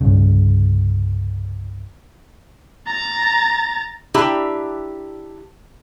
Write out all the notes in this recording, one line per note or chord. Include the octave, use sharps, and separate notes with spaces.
C2 G2 C#3
A#5 A6
D4 E4 G4 A#5